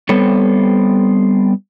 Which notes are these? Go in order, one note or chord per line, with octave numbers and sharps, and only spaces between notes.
G3 B3 C4 A4 C#5